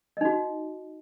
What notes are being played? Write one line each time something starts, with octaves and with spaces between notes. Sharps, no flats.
D#4 F#4 D#5